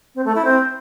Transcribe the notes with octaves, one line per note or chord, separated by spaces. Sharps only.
C4
A3
E4
C4